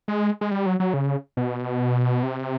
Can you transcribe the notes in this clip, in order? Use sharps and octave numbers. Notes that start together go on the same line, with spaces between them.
G#3
G#3
G3
F#3
F#3
C#3
B2
C3